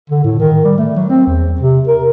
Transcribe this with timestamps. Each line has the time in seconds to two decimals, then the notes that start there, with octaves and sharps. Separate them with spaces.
0.10 D3
0.24 A2
0.40 D#3
0.64 G3
0.78 A3
0.96 F#3
1.09 C4
1.27 E2
1.61 C3
1.88 A#4